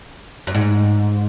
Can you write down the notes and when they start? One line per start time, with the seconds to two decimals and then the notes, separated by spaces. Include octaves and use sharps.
0.47 F#2
0.55 G#2